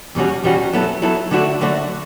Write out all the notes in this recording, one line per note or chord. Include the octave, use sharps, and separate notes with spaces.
E2 B2 G3 C#4 F#4
E2 B2 G3 C#4 F#4
F#3 B3 E4 A4
F#3 B3 E4 A4
D3 F#3 A3 D4 F#4
D3 F#3 A3 D4 F#4